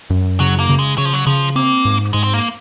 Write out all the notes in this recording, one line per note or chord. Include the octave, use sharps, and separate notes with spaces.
F#2
C#3 F#3
A#3
C#3
G#3
C#3 F#3
F3
F#3
C#3 F3
A#3 C4
G#2
G#2 G#3
C4
A#3